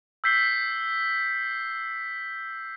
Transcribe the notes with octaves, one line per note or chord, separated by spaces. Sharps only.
E6 G6 B6 C7 G7